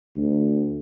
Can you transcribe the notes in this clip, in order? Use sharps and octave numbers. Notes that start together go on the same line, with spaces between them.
D2